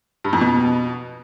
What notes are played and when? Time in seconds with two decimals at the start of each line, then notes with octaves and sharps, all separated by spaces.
0.24 G2
0.33 F2
0.41 B2